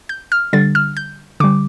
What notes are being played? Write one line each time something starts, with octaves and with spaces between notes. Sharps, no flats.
G6
F6
D3 G3 A6
F6
G6
D3 G3 D6